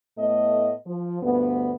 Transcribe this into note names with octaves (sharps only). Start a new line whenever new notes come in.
A2 A3 B3 D#5
F3
D2 G2 B3